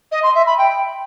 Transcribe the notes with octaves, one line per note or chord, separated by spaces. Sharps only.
D#5
C6
E5
B5
G5